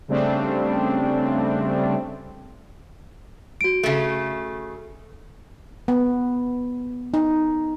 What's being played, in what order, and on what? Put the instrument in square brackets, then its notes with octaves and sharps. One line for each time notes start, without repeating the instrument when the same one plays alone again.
[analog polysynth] C#3 G3 A3 C4 D4
[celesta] F#4 D7
[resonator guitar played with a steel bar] C#3 A3
[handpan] B3
D#4